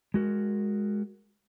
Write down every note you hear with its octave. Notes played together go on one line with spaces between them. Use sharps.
G#3 F#4 A#4